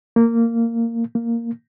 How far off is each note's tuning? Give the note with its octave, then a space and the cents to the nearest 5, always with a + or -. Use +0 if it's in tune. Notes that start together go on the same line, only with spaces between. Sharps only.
A#3 -15
A#3 -5